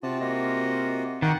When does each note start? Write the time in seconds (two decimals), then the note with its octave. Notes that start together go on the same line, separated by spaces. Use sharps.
0.03 C3 F4 F#4 A5
0.20 A#3 F4 F#4 D#5
1.22 D#3 F5 F#5 C#6 D6